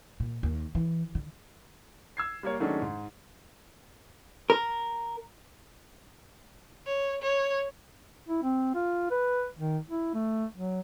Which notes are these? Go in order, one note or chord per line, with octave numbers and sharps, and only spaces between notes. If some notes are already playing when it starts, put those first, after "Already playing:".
A#2
D#2
E3
D3
E6 G#6 C7
G3 A#3 C#5
D#3 F#3 G#3 A3 C#4 D4
G#2
A#4
C#5
C#5
E4
C4
F4
B4
D#3
E4
A3
F#3